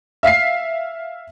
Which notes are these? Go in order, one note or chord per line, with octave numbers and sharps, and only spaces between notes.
E5 F5 B6 C7